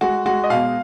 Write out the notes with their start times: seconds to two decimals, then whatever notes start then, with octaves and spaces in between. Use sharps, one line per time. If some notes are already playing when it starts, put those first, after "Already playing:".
0.01 G#3 F#4
0.26 G#3 F#4
0.44 D#5
0.50 B2 F5